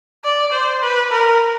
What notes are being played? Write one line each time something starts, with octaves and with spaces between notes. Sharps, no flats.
D5
C5
B4
A#4